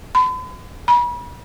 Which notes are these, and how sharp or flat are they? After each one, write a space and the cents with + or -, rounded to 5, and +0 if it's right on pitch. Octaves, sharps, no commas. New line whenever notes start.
B5 +45
B5 -35